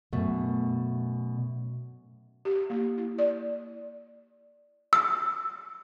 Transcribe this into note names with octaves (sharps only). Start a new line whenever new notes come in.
F#2 B2 A3
G4
A#3
E4
D5
E6